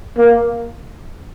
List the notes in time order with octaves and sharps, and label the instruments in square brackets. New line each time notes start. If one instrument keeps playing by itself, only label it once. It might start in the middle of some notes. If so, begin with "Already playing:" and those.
[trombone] A#3